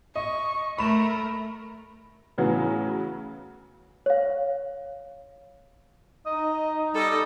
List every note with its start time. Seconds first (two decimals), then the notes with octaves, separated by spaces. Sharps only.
0.16 D#5 C#6
0.78 A3 A#4 B5 E7
2.38 A2 C#3 E3 F#3 B3
4.06 C#5 F5
6.26 D#4 D#5
6.94 G3 A4 D#5